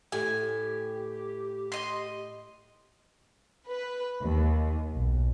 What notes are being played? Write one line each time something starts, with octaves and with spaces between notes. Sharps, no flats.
A2 G4 G#5
D#5 C6
B4
D#2
B1